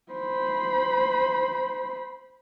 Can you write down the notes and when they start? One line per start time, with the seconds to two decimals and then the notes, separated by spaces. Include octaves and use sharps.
0.13 C5 B5